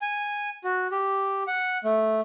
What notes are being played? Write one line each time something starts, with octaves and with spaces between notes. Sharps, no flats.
G#5
F#4
G4
F#5
A3